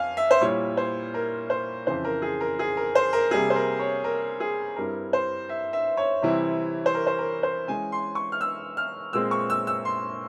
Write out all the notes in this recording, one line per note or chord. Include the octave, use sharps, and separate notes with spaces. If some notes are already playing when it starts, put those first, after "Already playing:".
Already playing: F2 F5 G#5
E5
C5
A#2 G3 A#3 E4 C#5
C5
A#4
C5
F2 C#3 E3 C5
A#4
G#4
A#4
G#4
A#4
C5
A#4
C3 G3 A#3 G#4
C5
A#4
C#5
A#4
G#4
G2 G3 C4 E4 A#4
C5
E5
E5
C#5
C3 E3 G3 C4 E4
C5
A#4
C5
A#4
C5
E3 G#3 C#4 G#5
C6
C#6
F6
E6
F6
A#2 G#3 C4 E6
C#6
E6
E6
C6